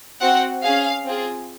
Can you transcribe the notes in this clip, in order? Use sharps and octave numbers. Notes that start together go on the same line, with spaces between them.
C4 F#4 F#5
C#4 G#4 F5
C4 F4 G#4